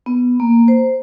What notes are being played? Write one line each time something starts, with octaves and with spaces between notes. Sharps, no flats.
B3
A#3
C5